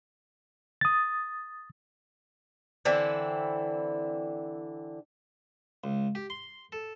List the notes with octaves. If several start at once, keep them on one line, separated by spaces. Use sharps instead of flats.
D#6 A6
D3 E3 C4 E4
C#2
G4
C6
A4